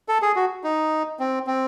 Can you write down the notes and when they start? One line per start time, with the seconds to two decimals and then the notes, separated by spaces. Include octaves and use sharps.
0.08 A4
0.22 G#4
0.36 F#4
0.64 D#4
1.19 C4
1.47 C4